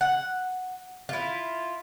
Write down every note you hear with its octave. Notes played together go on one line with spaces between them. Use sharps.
F#5
E4 F4